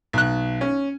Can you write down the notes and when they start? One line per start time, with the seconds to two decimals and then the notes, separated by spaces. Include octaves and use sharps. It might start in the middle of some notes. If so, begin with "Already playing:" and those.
0.13 B1 F#6
0.61 C#4